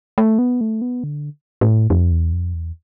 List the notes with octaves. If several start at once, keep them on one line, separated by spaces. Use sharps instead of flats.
A3
B3
A3
B3
D3
A2
F2
E2
F2
E2